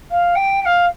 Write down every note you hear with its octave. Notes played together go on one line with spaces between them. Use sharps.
F5
G5
G5
F5